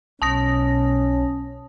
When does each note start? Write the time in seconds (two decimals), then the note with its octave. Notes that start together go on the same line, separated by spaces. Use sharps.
0.22 B1 B2 C#4 A5 D#6 A#6